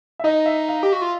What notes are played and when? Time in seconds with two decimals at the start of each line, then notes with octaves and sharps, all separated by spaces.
0.19 E5
0.24 D#4 D#5
0.46 E5
0.68 F5
0.83 G4
0.93 F#4
1.02 F4